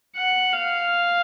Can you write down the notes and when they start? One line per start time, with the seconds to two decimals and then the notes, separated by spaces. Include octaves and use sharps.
0.16 F#5
0.53 F5